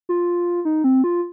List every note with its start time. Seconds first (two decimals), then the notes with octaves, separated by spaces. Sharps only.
0.09 F4
0.65 D#4
0.84 C4
1.04 F4